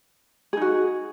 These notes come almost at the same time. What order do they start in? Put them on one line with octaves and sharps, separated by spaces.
G#4 D#4 F#4